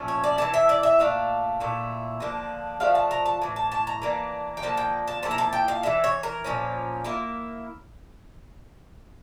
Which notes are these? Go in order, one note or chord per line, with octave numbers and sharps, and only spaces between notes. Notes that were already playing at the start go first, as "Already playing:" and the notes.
Already playing: A#2 F3 A3 C#4
C#5
D5
E3 A#3 E4 A5
E5
D5
E5
A#2 A3 D4 F5
A#2 A3 E4
D3 F3 A#3 D4
F3 A3 D4 F5
A5
A#5
A5
A2 E3
A5
A5
A#5
E3 A#3 D4
G5
D3 F3 A#3 A5
G5
A5
F3 A#3 E4 A5
A#5
A5
G5
F5
E3 A#3 D4 E5
C#5
A#4
A#2 F3 A#3 C#4
A#3 E4 F4